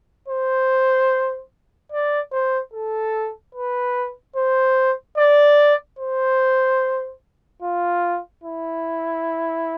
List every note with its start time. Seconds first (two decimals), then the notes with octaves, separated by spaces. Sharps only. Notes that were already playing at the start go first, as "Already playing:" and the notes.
0.28 C5
1.92 D5
2.32 C5
2.74 A4
3.55 B4
4.36 C5
5.18 D5
5.99 C5
7.62 F4
8.44 E4